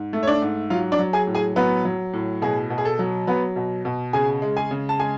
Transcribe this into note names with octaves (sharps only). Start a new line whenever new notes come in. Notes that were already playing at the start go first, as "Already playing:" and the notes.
Already playing: G#2
A3
C#5
D4 D5
G#2
F#3 F4 F5
D4 D5
F#3
G#4 G#5
A2
G#4 G#5
F#3 B3 B4
F#3
A2
B2 G#4
B2
G#4
A4
F#3
F#3 B3 B4
B2
B2
C#3 G#4 G#5
G#3
G#4 G#5
C#3
A5
G#3 G#4 G#5